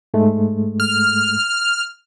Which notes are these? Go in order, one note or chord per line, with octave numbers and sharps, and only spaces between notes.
G#2 G#3 A3
F6